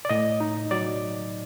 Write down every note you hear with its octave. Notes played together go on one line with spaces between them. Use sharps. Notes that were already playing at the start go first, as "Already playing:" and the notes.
D5
A2 D#5
D#4
F#3 D5